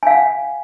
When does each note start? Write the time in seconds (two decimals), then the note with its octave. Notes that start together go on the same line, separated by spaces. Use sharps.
0.03 G#5
0.07 F5
0.11 F#5